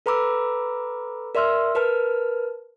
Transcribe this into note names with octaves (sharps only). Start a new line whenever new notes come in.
A4 B4 A#5 B5 D6 E6
A#4 D5 E5 C6 E6 F6
A#4 B4 A5 F6